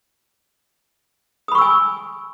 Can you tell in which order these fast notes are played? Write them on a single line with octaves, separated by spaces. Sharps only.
D#6 B5 C#6 E6 G#5